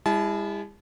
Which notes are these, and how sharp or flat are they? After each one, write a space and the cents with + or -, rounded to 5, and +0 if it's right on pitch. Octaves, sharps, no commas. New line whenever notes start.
G#3 -45 E4 +0 A5 -35